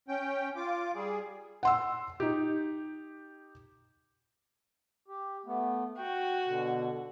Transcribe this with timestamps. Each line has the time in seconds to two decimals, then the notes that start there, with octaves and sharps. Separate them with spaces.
0.08 C#4 G5
0.56 F4 D6
0.95 G3 G#4
1.63 F#5 C6 E6
2.20 D#4 G4
5.08 G4
5.46 A3 B3
5.97 F#4 G5
6.46 B2 D3